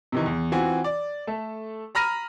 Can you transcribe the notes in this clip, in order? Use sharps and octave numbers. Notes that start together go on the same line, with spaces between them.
C3 D#3 E3
E2
E3 C4 F4 F#4 G#5
D5
A3 A4
A#5 B5 F6 A#6 D#7